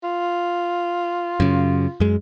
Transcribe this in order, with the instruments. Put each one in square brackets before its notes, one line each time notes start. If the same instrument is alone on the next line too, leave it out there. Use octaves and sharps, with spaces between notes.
[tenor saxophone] F4
[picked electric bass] F#2 C#3
F#2 G#3